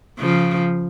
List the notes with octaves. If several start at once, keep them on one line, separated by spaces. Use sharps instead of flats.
C#3 F3